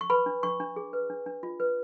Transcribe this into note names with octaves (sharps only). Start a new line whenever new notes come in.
C#6
B4 B5
D4
D4 C#6
D4
G#4
B4
D4
D4
F4
B4